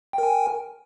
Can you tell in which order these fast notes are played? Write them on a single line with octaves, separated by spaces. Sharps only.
G5 A#4 G#5